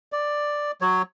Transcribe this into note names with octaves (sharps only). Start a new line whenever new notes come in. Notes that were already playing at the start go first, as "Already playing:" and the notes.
D5
F#3 C#5